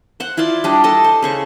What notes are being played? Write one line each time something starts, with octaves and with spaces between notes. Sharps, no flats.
C5 F#5
E4 F4 D5 C6
G3 D4 D#5
A4 D#5
C5
C#3 C5 C#6